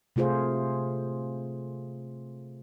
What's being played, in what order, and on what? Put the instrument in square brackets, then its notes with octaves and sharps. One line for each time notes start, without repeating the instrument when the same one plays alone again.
[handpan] C3 A3 F4 G#4 C5